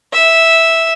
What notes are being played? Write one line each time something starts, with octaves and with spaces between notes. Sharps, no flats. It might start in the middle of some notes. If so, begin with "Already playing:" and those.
E5